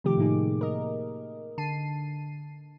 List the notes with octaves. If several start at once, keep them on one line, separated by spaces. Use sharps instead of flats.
C3 D#3 F3 A3 G4 D6
A2 C3 A#3 D#4 G#4
A#4 D#5
D3 A5 C7 D#7